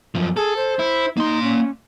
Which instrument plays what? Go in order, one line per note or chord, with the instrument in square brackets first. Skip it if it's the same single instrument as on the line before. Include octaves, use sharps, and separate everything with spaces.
[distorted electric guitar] F#2 F3
[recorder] G#4 [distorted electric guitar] A4
[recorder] C5
[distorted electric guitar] E4
[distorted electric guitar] A#3 C6 [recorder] D#4
[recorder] C#4